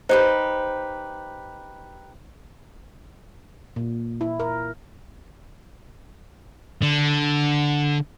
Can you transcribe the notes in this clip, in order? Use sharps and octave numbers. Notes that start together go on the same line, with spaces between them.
D#4 G4 B4 C5
A#2
E4
A#4
D3